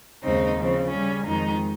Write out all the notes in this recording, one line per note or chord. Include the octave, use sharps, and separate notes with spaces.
D#2 C#3 G#3 C4 D#4
C#3 F3 C4
C#3 G3 C#4
F2 D#3 G#3 D#4